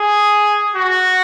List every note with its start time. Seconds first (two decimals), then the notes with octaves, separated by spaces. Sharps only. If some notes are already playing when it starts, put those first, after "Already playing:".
Already playing: G#4
0.75 F#4